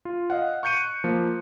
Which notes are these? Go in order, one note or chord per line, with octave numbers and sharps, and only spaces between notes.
F4
D#5 F5 F#5
C#6 F#6 G6 C#7 D#7
F3 A#3